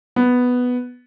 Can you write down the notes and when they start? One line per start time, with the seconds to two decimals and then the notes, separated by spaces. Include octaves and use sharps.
0.16 B3